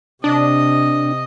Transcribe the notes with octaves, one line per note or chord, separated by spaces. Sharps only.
C3 D4 D#5